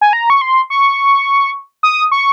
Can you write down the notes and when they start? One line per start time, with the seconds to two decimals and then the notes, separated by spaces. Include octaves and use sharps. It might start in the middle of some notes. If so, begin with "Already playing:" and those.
0.01 G#5
0.13 A#5
0.30 C#6
0.41 C6
0.70 C#6
1.83 D#6
2.12 C#6